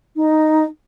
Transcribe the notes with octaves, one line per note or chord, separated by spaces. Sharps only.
D#4